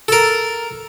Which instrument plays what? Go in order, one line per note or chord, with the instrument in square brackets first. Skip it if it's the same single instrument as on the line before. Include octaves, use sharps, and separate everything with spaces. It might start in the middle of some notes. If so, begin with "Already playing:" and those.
[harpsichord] A4 A#4